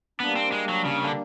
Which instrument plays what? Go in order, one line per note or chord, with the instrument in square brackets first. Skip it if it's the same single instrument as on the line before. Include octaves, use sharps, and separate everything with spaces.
[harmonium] G3 A#3 D4 [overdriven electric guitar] B3
[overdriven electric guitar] C4
G#3
F#3
C#3
D3